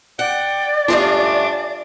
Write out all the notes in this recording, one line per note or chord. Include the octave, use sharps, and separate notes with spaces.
D5 F#5 G5
G2 A3 C#4 D4 F4 D#5 F5